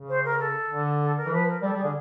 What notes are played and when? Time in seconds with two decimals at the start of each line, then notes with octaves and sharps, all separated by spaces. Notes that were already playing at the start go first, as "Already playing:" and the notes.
Already playing: C#3
0.08 C5
0.24 A#4
0.39 A4
0.70 D3
1.00 A4
1.16 A#4
1.26 E3
1.32 F3 B4
1.47 A#4
1.62 G3 A4
1.73 G3
1.78 G#4
1.84 D3